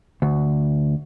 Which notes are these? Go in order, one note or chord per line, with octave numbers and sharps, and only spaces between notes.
D2